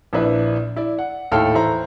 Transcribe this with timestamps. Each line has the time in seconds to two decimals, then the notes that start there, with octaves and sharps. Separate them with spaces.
0.13 A#1 D4 E4 B4
0.76 E4 D5
0.99 F#5
1.32 D#2 A2 A4 F5 G5 F6
1.55 E3 E4 C5 A#5